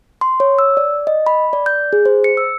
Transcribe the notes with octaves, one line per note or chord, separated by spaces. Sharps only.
C6
C#5
E6
D5
D#5
B5
D5
G6
G#4
C5
C#7
E6